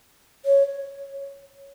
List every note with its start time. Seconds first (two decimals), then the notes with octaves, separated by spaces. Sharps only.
0.45 C#5